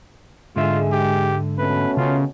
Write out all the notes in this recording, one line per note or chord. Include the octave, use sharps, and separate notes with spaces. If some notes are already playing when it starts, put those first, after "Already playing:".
G#2 D3 G#3 F4 E5
G4
B2 A3 C#4 B4
C#3 F4